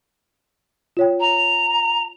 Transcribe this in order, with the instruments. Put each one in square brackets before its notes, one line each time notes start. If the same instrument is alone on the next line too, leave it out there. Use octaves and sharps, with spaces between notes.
[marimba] F4 C#5 G5
[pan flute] A#5